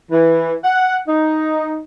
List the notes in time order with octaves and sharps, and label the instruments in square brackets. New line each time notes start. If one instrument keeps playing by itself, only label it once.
[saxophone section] E3
F#5
D#4